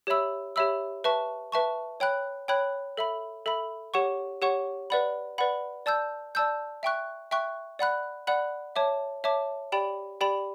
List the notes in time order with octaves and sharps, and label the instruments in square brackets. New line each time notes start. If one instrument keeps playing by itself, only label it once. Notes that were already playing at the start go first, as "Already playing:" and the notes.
[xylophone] G4 C#5 E5 B5 E6
G4 C#5 E5 B5 E6
B4 E5 A5 C#6
B4 E5 A5 C#6
C#5 G5 B5 F#6
C#5 G5 B5 F#6
A4 E5 B5
A4 E5 B5
G4 C#5 F#5 C#6
G4 C#5 F#5 C#6
B4 D5 F#5 B5
B4 D5 F#5 B5
D5 A5 E6 G6
D5 A5 E6 G6
E5 G5 C#6 F#6
E5 G5 C#6 F#6
D5 F#5 B5 F#6
D5 F#5 B5 F#6
C#5 E5 A5 D6
C#5 E5 A5 D6
G4 D5 G5 B5
G4 D5 G5 B5